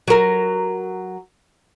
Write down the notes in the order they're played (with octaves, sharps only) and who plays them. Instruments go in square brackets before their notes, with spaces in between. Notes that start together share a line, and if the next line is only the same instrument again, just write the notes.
[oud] F#3 A#4